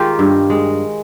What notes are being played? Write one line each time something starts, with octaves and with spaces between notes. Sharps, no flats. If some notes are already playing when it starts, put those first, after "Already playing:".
Already playing: D#3 G#3 F4 G4 A#4
G2
G#3